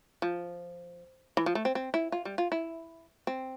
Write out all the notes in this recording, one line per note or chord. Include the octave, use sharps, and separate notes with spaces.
F3
E3
F3
A3
C4
C4
E4
F4
G3
F4
E4
C4